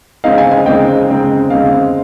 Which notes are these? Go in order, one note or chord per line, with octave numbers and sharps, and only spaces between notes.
C#3 G#3 C4 D#4 F5
G#5
G#5
C#3 G#3 C4 D#4 G5
C#3 G#3 C4 D#4
C#3 G#3 C4 D#4 F5